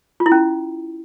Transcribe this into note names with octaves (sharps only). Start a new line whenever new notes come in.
F4
E4
C#4